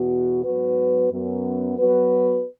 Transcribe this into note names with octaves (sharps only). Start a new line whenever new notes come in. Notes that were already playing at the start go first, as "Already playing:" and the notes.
Already playing: E2 B2 B3 F#4
G#2 F#3 B3 F#4 B4
F#2 F#3 B3
F#3 B3 F#4 B4